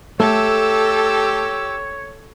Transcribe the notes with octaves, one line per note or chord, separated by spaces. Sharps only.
A3 G4 A4 C#5 E6